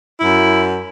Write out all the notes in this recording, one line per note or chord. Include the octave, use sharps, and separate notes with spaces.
F#2 E4